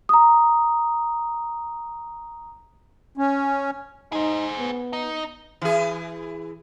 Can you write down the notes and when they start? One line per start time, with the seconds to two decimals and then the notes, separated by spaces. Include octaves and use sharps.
0.09 A#5 D#6
3.17 C#4
4.13 D#4 G#4 C5
4.59 B3
4.93 D#4
5.61 E3 G#4